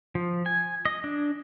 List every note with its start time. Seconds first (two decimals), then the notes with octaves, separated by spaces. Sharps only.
0.15 F3
0.46 G#5
0.85 D#5
1.04 D4